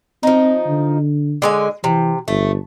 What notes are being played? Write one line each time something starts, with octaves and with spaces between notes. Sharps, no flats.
F3 C4 D#4
D3
D3 G#3 G#5
C3 E3
G1 A3